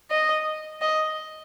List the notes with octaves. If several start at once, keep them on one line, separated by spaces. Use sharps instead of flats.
D#5
D#5